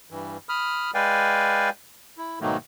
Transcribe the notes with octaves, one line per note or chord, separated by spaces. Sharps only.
G2 E3
B5 D#6 F6
G#3 B4 D5 F5 G5 G#5
E4
G#2 B2 D#3 F#3 A3 A#3